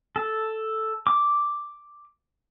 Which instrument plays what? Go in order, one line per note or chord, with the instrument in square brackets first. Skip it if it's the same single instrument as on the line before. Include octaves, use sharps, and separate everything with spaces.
[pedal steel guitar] A4
D6